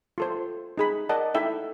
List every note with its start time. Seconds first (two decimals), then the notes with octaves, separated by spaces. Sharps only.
0.18 F4 A4 C5
0.78 D#4 G#4 B5
1.09 A#4 D5 D#5 F#5 A5
1.34 D#4 E4 A4 E5 G5